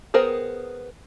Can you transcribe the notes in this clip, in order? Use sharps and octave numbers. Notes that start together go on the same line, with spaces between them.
B3 G#4 A#4 C5 G5